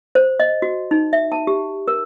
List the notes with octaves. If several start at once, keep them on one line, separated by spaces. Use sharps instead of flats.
C5
D#5
F#4
D#4
E5
A5
G4
A#4